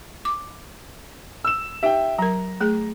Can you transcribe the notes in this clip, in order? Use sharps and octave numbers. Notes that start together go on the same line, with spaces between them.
D6
E6 E7
D#4 G4 E5 G5
F#3 A#4 A#5
A3 G#4